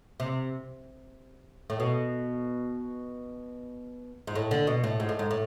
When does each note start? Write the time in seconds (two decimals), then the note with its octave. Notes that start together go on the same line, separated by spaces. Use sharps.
0.20 C3
1.70 A2
1.80 B2
4.27 G#2
4.35 A2
4.51 D3
4.67 B2
4.84 A2
5.00 G#2
5.09 A2
5.19 G#2
5.31 A2